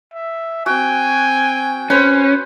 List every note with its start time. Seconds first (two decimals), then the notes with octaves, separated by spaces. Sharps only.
0.14 E5
0.66 C4 F#4 G5 G#5
1.90 C#4 B4 C5